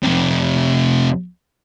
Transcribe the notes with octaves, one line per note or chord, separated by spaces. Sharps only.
F2 C3